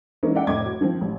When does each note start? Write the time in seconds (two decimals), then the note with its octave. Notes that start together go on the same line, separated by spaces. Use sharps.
0.23 E3 G#3 A#3 C#4 D#4 E4
0.36 D5 E5 F#5 G5
0.47 F1 A2 D#5 D6 G#6
0.65 F#4
0.81 D#3 F3 C4
1.01 A1